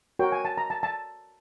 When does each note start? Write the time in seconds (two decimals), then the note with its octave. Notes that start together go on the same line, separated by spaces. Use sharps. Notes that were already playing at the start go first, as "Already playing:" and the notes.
0.19 F#4 A#4 C#5 G5
0.32 G#5
0.45 A5
0.58 A#5
0.70 A5
0.83 A5